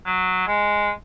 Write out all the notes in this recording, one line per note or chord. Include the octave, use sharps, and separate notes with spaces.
F#3
G#3